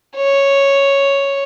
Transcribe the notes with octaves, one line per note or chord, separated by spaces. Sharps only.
C#5